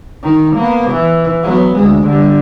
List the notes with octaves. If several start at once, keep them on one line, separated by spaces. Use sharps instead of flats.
D#3 D#4
A#3 B3
E3
F#3 B3
D2 G#3
D3 G3